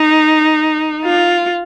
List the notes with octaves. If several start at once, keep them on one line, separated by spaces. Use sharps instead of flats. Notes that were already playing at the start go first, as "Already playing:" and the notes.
Already playing: D#4
F4